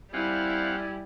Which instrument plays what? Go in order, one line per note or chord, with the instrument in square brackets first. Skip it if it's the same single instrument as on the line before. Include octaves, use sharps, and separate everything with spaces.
[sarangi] G3 [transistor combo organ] C4 F5 F#5 [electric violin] E4 [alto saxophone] G#5